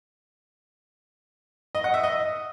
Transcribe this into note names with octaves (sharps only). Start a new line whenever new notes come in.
D#5
F#5
E5
D#5